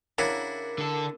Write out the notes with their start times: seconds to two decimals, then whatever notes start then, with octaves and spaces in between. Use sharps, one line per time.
0.18 C#3 D4 E4 F#4 A#4
0.78 D3 A4